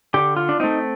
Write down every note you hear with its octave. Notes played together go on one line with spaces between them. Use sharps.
D3 G4
F4
D4
A3 C4 D#4